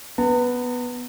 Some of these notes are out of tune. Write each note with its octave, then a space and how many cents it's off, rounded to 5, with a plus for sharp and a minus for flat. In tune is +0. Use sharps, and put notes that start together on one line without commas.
B3 +0 A#5 -45